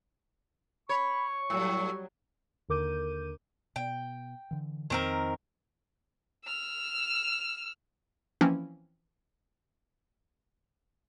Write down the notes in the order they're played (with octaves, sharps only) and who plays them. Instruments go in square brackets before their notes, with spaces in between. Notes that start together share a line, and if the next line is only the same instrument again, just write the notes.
[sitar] C#5 [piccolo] B5 [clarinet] C#6
[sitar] A2 [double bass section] F#3 G3 [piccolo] E6
[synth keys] D#2 D3 A#4 D6 G6 D#7
[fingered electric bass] B2 [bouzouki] G5
[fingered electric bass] D3 E3
[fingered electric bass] F2 [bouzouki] D#3 C4 A#4
[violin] E6 F6
[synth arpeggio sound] E3 F3 A#3 C4 C#4 E4